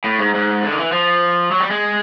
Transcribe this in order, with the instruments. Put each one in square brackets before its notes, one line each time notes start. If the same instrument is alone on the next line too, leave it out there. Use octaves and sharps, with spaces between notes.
[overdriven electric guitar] A2
G#2
G#2
D3
D#3
E3
F3
F#3
G3
G#3